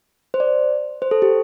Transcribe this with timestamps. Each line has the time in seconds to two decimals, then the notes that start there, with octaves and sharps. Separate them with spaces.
0.34 C5
0.40 D5
1.02 C5
1.11 A4
1.22 G4